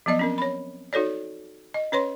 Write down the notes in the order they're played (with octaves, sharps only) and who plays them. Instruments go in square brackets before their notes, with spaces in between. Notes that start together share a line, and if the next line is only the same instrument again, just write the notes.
[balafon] F3 F#3 B3 D5 D#5
C4 C#4 A#4
C#5 B5
D#4 F#4 A4 C#5 D5
D#5
C#4 B4 C#5 C6